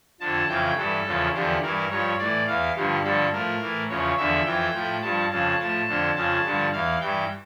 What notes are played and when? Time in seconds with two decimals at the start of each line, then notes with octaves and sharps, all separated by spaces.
0.20 F2 D3 F3 A5
0.48 F2 C#3 E3 G5
0.76 G2 E3 A4
1.06 E2 C#3 F3
1.34 E2 D3 F3 G4
1.62 G2 E3 A#4
1.90 G2 F3 C#5
2.19 A2 E3 D5
2.47 E2 E3 F5
2.76 G2 D3 F3 G4
3.03 G2 D3 F3 A4
3.32 A2 F3 A#4
3.61 A2 E3
3.89 E2 C#3 F3 C#5
4.17 E2 D3 F3 E5
4.45 F2 E3 G5
4.74 A2 F3
5.02 G2 F3 A5
5.31 F2 C#3 F3 A5
5.59 A2 F3 A5
5.88 F2 D3 F3
6.16 F2 C#3 F3 A5
6.44 G2 D3 F3
6.72 E2 E3 F5
7.01 G2 E3 G5